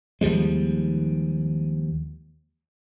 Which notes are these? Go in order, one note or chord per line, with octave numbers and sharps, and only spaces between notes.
D#2 F3 G3 G#3